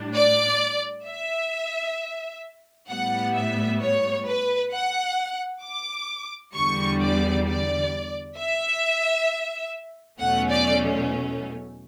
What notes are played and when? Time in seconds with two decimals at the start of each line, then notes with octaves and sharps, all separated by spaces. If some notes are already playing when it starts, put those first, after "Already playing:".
Already playing: A2 G3 D4
0.15 D5
1.06 E5
2.89 A2 G3 B3 F#5
3.34 E5
3.81 C#5
4.27 B4
4.72 F#5
5.63 D6
6.54 E2 D3 G3 C#6
7.00 D5
7.47 D5
8.38 E5
10.19 E2 B2 F#3 A3 C#4 F#5
10.50 D5